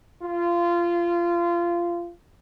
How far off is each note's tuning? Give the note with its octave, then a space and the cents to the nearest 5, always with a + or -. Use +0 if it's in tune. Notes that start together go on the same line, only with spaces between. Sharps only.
F4 -20